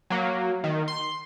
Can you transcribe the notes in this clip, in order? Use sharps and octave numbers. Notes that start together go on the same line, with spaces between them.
F#3 A#3
D#3
C6